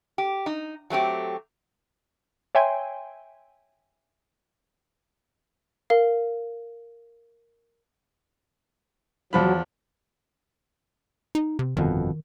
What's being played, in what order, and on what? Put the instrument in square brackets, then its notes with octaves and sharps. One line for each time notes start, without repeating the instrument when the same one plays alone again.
[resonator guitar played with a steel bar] G4
D#4
F#3 A3 C4 G4
[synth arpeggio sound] C#5 E5 G5 G#5 C6
[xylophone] A#4 F5
[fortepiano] E2 F3 B5 [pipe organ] F#3
[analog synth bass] D#4
C3
[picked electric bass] G1 F2 B2 [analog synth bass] D#3